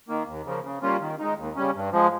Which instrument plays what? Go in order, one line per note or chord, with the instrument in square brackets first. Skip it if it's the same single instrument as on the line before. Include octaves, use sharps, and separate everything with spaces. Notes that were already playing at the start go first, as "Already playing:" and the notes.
[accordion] D#3 A#3
D#2
C#3 F3 A#3
C#3
G3 A#3 C#4 F4
D#3
G#3 D#4
D#2
C#3 G3 C#4
G2
F3 G#3